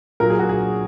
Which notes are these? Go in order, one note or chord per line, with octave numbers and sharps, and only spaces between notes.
A#2 F#3 A#4
G#4
F#4
G#4